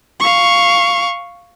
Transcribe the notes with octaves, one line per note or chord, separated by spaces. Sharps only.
F5 C#6